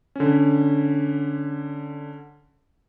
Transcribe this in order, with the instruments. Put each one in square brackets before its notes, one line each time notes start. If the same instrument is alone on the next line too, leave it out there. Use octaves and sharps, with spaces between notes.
[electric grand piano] D3 C#4